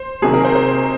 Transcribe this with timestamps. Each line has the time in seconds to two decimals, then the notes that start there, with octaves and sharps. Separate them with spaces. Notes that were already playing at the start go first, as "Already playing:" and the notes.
Already playing: C5
0.22 C3 D#3 F#3 G#4
0.33 A#4
0.44 C5
0.55 C5